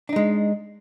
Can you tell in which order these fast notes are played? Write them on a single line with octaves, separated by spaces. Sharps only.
D4 D#4 G#3